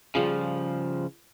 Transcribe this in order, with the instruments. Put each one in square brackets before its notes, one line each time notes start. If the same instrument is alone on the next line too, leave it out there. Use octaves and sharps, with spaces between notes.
[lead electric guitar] C#3 F3 [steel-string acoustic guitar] G3 F4 G#4